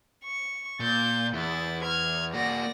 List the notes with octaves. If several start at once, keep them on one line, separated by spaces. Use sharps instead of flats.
C#6
A#2 G6 A6
E2 E4 A6
F6 G#6
A#3 F#4 D5 A#6